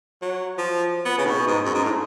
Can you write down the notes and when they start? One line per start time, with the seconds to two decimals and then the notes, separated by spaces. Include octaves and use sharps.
0.22 F#3
0.58 F3
1.05 B3
1.18 C#3
1.26 A2
1.30 B2
1.47 G#2
1.65 F#2
1.74 G#2
1.84 A2